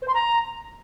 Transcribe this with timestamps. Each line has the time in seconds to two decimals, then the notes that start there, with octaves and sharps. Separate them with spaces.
0.02 C5
0.08 C6
0.14 A#5